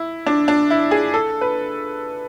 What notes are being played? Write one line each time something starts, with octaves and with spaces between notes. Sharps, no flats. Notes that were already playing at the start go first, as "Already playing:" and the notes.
Already playing: E4
D4
D4
E4
G#4
A4
B4